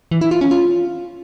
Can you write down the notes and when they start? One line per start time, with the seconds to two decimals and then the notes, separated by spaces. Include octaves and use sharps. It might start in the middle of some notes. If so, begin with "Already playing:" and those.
0.11 E3
0.21 E4
0.31 F4
0.41 C#4
0.51 F4